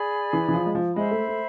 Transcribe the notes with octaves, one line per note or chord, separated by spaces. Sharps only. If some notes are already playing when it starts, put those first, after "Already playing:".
Already playing: G#4 D5 G#5 B5
E3
E3
F3
G#3
F3
G#3 C5 E5 B5
A3
A3